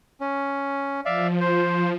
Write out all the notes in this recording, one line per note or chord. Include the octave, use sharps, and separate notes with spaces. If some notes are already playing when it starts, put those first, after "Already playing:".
C#4
F3 D5 E5 F5
C5